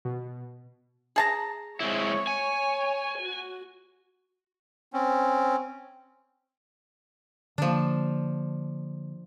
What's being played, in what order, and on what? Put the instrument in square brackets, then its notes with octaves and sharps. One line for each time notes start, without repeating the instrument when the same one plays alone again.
[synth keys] B2
[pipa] G#4 A5 A#5
[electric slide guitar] G#3 C4 E4 [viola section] C#5
[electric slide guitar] G#5
[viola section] F#4
[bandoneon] C4 C#4
[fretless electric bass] D3 A#3 [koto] F3 D4